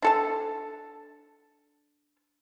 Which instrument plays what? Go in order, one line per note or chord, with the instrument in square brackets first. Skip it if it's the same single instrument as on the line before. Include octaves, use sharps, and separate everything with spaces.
[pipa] D4 A4 A5